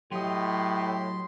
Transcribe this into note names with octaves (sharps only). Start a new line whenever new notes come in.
A2 F#3 G4 D#5 C6